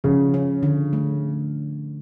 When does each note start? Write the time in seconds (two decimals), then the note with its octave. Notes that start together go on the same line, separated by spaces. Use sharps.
0.04 C#3 F3
0.34 C#4
0.63 D3
0.93 A3